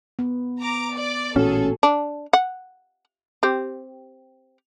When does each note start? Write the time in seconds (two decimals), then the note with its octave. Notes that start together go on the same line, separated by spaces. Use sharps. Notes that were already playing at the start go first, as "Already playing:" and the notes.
0.19 B3
0.61 A#5 D6
0.95 D5
1.36 A1 A#2 A#3 C#4 F#4 G#4 A4
1.83 D4
2.33 F#5
3.43 C4 G4